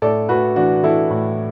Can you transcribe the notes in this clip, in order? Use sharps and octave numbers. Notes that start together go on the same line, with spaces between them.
A2 A4 D5
A2 F#4 B4
E3 D4 F#4
E3 E4 A4
A2